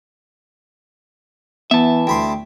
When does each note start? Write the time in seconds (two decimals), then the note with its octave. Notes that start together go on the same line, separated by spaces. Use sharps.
1.71 E3 B3 E5 A5
2.07 D2 G5 B5 C6